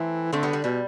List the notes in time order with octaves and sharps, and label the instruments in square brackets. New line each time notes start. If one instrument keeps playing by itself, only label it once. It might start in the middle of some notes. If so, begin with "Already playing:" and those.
Already playing: [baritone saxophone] E3 [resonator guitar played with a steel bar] A3 C4
[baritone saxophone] D3 [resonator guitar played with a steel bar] A3 C4
[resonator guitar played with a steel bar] G3 B3
G3
[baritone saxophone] B2 [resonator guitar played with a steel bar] G3